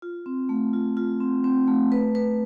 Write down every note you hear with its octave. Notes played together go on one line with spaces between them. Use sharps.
F4
C4
A3
F4
F4
C4
C4
A3
B4
B4